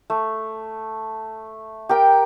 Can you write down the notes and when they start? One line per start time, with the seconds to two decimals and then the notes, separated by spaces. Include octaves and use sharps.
0.10 A3
1.89 G4 A#4 G5